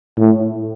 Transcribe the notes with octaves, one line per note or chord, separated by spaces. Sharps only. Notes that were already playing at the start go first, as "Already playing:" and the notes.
A2